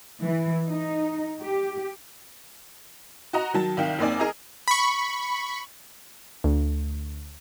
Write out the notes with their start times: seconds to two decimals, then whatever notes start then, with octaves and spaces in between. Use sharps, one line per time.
0.22 E3
0.68 D#4
1.41 G4
3.33 F#4 D#5 A#5
3.54 D#3 F#3 A5
3.77 C2 D#3 F5 G5
3.99 F#1 A#3 C4 D#4 D5 G#5
4.19 G#4 A#4 D#5 A#5
4.68 B5 C#6
6.44 D2